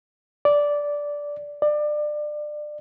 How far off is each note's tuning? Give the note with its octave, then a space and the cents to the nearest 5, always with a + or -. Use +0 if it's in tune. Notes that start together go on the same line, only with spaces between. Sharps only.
D5 -10
D5 +25